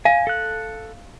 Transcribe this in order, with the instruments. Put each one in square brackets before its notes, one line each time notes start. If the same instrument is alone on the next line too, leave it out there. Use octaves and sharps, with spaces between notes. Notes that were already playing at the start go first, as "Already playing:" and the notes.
[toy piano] F5 [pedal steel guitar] G#5
[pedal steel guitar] A4 F#6